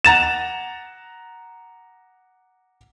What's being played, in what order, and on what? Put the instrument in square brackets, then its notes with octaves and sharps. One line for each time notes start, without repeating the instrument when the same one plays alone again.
[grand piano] F#5 A#5 A6 E7